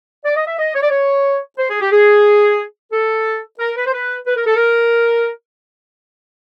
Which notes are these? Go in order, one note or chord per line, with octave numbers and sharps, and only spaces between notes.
D5
D#5
E5
D#5
C#5
D5
C#5
C5
G#4
G4
G#4
A4
A#4
B4
C5
B4
B4
A#4
A4
A#4